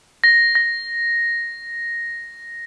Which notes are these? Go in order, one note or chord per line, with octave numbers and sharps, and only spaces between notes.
A#6
A#6